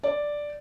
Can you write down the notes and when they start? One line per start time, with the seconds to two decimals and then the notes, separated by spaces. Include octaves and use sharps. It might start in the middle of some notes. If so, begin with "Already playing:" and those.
0.03 D5